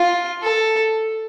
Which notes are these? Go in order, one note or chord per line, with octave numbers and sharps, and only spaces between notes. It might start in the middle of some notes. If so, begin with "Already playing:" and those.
Already playing: F4
A4